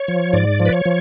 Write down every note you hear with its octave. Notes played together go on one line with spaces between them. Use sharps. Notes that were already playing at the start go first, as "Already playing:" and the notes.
Already playing: C#5
F3
G#2 D5
F3
B4
C#5
F3